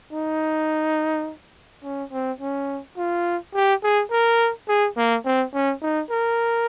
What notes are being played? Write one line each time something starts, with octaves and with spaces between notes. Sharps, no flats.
D#4
C#4
C4
C#4
F4
G4
G#4
A#4
G#4
A#3
C4
C#4
D#4
A#4